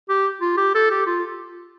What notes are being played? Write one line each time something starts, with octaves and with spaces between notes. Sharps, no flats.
G4
F4
G4
A4
G4
F4